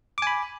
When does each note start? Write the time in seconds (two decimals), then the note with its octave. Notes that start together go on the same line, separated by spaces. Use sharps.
0.18 D6
0.22 G#5
0.27 B5